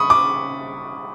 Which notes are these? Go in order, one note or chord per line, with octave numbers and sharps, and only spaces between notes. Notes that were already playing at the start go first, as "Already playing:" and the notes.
Already playing: B5 C#6 D#6
D6